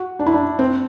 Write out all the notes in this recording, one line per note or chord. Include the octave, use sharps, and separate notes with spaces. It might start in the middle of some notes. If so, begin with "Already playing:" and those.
Already playing: F#4
D4
E4
D4
C4